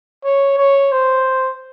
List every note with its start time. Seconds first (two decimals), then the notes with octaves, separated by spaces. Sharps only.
0.24 C#5
0.58 C#5
0.92 C5